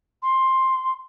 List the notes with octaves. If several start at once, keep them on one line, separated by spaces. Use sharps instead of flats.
C6